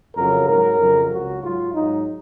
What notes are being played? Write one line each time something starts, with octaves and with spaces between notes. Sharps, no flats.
F2 C#3 F#3 A#4
G#2 F#3 A#4
F2 C#3 F#3
C#2 C#3 F#3 F#4
G#2 F#3 F4
G#2 F#3 D#4